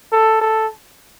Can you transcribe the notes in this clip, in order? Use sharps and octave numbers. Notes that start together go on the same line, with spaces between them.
A4
A4